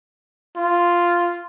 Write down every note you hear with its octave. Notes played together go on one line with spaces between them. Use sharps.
F4